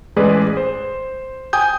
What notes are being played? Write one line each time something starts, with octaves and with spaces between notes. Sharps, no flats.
A1 G#3 G#4 B4 D5
C5
G5 G#5 D#6 G6